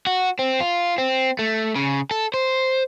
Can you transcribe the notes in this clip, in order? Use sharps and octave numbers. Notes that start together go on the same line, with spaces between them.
F#4
C4
F4
C4
A3
C#3
A4
C5